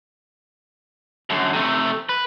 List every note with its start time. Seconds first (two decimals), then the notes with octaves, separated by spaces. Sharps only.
1.30 F#2 D3
1.53 C3 A3
2.09 B4